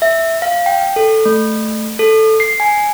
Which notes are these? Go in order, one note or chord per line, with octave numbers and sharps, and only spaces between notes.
E5
F5
G5
A4
A3
A4
C7
G#5